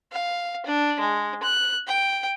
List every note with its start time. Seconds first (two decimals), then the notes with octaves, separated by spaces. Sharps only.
0.13 F5
0.66 D4
1.00 G#3
1.43 F#6
1.87 G5